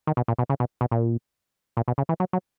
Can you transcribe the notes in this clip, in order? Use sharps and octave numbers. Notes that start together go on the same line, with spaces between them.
D#3
B2
A#2
B2
C#3
B2
B2
A#2
A#2
B2
C#3
E3
F#3
F#3